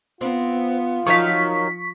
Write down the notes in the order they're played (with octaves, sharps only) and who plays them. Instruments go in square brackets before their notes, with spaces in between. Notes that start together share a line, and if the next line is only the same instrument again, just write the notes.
[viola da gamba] B3 [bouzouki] C4 [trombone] F4
[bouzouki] D#3 F#3 F5 [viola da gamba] F3 [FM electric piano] C#6 B6